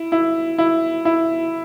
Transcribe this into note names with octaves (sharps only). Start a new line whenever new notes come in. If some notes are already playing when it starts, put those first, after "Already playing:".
Already playing: E4
E4
E4
E4